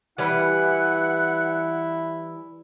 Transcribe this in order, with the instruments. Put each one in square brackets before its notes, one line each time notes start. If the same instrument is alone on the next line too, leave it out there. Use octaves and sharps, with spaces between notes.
[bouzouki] E3 G3 B4 [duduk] E4 [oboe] F#5